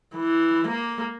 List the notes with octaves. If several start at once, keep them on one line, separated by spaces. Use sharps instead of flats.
E3
A#3